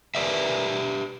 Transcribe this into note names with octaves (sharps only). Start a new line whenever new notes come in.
G4 B4 D5 E5